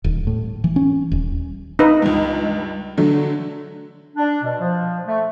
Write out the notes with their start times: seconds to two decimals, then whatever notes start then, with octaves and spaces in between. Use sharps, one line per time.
0.04 D#1
0.27 A2
0.64 E3
0.76 C#4
1.12 D#1
1.79 D#4 B4
2.02 C#2 G2
2.97 D3 F#3 A3
4.17 D4
4.44 B2
4.60 F3
5.07 A3